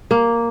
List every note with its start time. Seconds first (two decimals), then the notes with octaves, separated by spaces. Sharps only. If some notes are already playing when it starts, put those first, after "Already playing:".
0.11 A#3